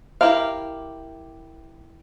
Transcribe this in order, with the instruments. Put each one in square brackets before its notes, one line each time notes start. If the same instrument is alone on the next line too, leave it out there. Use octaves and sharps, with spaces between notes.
[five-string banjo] E4 G4 A#4 F5